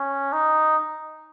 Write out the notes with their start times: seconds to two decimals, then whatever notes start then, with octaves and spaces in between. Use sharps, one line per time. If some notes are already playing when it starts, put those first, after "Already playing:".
Already playing: C#4
0.33 D#4